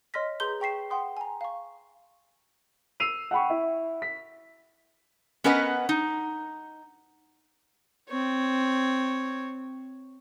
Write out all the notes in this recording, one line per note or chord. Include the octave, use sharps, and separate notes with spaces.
C#5 D#5 C6 F6 A#6 B6
G#4 B4 A#5 C6 G6 G7
G#4 G5 C#6 B6 C7 E7
F#5 G5 C6 D#6
G#5 A#5
F5 C#6
E6 C7 D#7 F7
F#5 G5 B5 C#6
E4
B6
B3 C#4 A#4 B4 D#5 F#5
D#4
C4 C#5